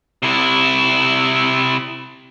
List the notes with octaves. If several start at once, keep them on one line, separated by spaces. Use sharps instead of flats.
C3 E4